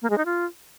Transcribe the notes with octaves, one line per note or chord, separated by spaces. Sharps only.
A#3
G#3
D#4
F4